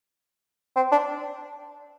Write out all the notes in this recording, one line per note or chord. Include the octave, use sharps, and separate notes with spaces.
C4
D4